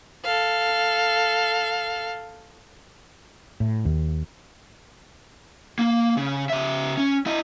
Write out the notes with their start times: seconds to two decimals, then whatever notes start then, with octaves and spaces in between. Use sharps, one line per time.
0.24 A4 F5
3.60 A2
3.85 D#2
5.79 A#3
6.17 C#3
6.50 C#3 E5
6.97 C#4
7.27 E4 D#5